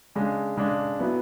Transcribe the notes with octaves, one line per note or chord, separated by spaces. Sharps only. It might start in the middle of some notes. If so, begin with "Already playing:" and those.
C#3 G#3 D4
C#3 G#3 D4
F#3 B3 E4